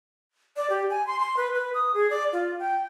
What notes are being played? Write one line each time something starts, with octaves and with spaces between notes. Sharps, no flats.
D5
G4
G#5
C6
C6
B4
B4
D#6
G#4
D5
F4
G5